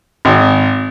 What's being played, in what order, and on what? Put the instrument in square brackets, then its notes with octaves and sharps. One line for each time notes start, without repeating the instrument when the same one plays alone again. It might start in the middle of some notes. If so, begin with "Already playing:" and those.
[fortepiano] G#1